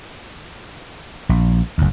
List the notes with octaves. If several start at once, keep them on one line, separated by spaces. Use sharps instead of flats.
A#1
F#1 D2